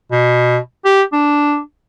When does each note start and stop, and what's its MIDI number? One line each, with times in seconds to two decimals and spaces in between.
0.12 0.57 47
0.85 1.02 67
1.13 1.59 62